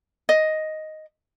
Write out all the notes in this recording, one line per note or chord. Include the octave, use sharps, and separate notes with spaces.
D#5